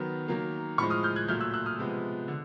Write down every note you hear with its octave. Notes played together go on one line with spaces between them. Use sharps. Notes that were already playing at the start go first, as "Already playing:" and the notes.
Already playing: D#3 F#3 B3
D#3 F#3 A#3
A2 F3 G#3 B5 C#6
D#6 F6
F6 G6
F#6 G#6
A#2 F#3 A3 F6 G6
E6 F#6
E6 F#6
D#6 F6
C3 F3 G#3 B3
D3